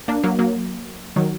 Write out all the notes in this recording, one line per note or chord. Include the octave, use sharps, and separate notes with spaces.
A#3 D4
F#3 A#3
F#3 A#3
D#3 F#3